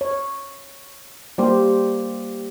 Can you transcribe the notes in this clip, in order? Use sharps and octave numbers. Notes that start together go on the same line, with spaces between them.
C#5
G3 A#3 G4 C5